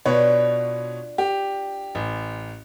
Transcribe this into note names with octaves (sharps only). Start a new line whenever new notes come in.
B2 D4 F4 B4 C#5
G4
A1